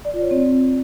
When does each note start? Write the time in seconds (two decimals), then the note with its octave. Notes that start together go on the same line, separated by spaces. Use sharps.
0.05 D5
0.14 F4
0.22 C#5
0.31 C4